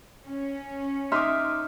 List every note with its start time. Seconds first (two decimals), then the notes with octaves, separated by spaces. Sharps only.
0.24 C#4
1.12 D#4 E5 C6 D6 D#6 F6